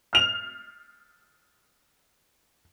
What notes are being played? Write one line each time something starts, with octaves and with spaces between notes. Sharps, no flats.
F6 F7